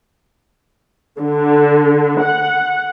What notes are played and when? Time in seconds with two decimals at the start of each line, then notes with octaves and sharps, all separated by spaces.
1.20 D3
2.21 F#5